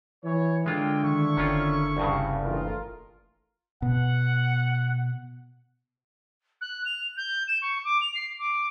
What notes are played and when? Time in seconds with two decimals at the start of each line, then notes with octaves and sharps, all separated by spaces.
0.25 E3 C#5
0.66 D3 G#3 A#3 F4 E5 G5
1.04 D#3 E4 E5 C#6
1.37 F#1 D#3 C#4 F4
1.97 C2 G2 C#3
2.43 A#1 E3 A3 F4 A#4
3.82 B2 F#5
6.61 F#6
6.85 F7
7.17 G6
7.48 E7
7.62 C#6
7.84 D6
8.01 F7
8.15 C7
8.39 D6